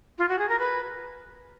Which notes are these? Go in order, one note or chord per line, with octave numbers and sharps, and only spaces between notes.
F4
F#4
G#4
A#4
B4